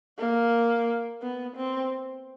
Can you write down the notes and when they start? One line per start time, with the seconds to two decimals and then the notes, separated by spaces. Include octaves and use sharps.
0.19 A#3
1.22 B3
1.56 C4